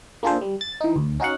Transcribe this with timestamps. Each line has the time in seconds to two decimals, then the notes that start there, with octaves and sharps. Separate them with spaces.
0.23 A#3 D4 F4 G#4 A4 C5
0.41 G3
0.61 A6
0.81 E3 D#4
0.96 D2
1.20 C#4 D#4 F#4 F5 F#5